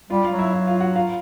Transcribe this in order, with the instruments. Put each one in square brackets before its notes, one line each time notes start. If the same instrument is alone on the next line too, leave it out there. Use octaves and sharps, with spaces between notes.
[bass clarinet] G3 [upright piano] F4 F5
[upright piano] F4 F5
[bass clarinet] F#3
[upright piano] E4 E5
E4 E5
F4 F5
F#4 F#5
F4 F5